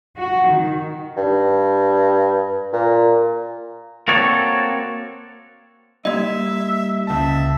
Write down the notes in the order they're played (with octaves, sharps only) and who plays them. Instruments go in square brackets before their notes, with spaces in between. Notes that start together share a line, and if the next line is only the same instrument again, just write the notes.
[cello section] F#4
D#3
[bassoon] G2
A#2
[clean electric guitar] A#3 C4 F#4 A4 C#5 D5
[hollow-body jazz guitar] G3 D#4 [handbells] A#3 D#5 [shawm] E5
[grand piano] C#2 A5 [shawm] E5